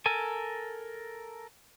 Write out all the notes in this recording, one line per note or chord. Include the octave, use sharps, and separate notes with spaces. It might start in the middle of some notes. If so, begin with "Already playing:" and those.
A4 A#4 G#5